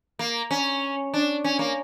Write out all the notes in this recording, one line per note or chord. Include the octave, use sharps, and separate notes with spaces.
A#3
C#4
D4
C#4
A#3